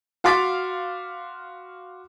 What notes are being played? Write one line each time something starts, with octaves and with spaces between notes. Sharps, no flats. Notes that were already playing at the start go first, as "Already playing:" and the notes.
F#4 F5 C6 D6 A6 B6